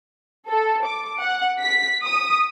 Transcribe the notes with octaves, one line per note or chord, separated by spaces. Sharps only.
A4
D6
F#5
B6
D#6